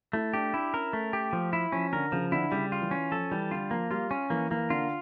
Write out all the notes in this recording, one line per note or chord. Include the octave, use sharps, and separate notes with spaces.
A3 E4
D4 G4
D4 E4
C#4 A#4
A3
G4
F3 A3
E4
F3 C#4
D3 A#4
C#3 F3
D3 E4
C#3 G3
F4
E3
C#4
F3 A4
E3 G3
D3 F4
F3 A#3
G3 F4
C#4
E3 A#3
E3 A#3
D3 F4